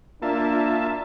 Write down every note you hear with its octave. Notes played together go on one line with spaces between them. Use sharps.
A#3 D4 F4 E5 A5